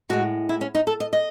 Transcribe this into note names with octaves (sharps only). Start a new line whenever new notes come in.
A2 G#3 F#4
E4
C#4
D#4
A4
D#5
D#5